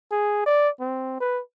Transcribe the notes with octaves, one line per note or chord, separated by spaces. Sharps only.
G#4
D5
C4
B4